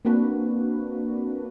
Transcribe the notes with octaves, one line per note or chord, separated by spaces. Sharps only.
A#3 C4 D4 F#4 B4